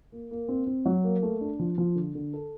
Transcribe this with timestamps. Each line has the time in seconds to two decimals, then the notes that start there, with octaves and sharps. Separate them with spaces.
0.12 A#3
0.31 A#3
0.48 C4
0.67 C4
0.86 F#3
1.04 A#3
1.23 A3
1.41 D4
1.59 F3
1.78 F3
1.96 D3
2.15 D3
2.33 A4